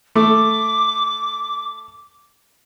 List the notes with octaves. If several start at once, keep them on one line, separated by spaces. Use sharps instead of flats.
A3 D6